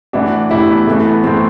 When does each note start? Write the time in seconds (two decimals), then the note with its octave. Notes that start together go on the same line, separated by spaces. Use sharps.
0.13 A2 E3 D4 F#4
0.50 A2 E3 E4 G4
0.69 B3
0.87 A2 E3 A3
1.05 B3
1.24 A2 E3 A3 C4